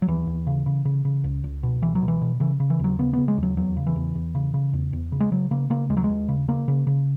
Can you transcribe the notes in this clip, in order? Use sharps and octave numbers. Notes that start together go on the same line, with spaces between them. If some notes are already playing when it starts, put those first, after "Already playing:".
F#3
D#2 E3
D#2
C#3
C#3
C#3
C#3
C#2
C#2
B2
C#2 E3
F#3
B2
E3
B2
C#3 E3
C#3
E3
D#2 F#3
C#3 B3
C#3 B3
G#3
D#2
F#3
E2 F#3
C#3
E3
E2
E2
C#3
C#3
E2
E2
C#3
G#3
C#3 F#3
C#3 A#3
C#3 A#3
D#2 G#3
F#3
G#3
D#2
C#3
C#3 A#3
C#3
C#3